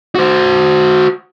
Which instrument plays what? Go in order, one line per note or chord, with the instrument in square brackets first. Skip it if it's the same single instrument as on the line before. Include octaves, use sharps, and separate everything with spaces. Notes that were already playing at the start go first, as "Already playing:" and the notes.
[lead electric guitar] F#4 C5